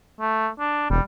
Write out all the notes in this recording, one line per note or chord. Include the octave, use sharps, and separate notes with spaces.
A3
D4
E1 G3